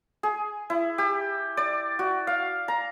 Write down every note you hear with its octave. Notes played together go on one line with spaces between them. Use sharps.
G#4
E4
G4
D5
F#4
F5
A#5